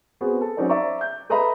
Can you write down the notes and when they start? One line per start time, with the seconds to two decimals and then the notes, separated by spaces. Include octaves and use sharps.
0.21 B3 C4 F#4 G#4
0.41 A4
0.57 F#3 C4 C#4 D#4 C5 D5
0.69 C5 D5 E5 A#5 C#6 D6
1.01 G6
1.30 A4 B4 D#5 E5 A#5 B5